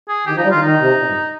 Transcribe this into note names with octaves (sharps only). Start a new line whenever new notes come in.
G#4
D#3 G4
F3 D#4
G3
D#3 F4
D#3 D#4
C3
A#2
G2